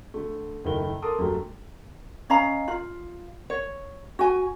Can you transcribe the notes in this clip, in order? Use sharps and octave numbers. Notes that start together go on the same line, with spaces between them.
D3 A3
F#1 D#3 A3 E4 G7
A4 A#4 A5 C6 D6 D#6
F#2 D3 F#3 G3 A3
C#4 D#5 F5 A#5
F4
C#5
F#4 G#5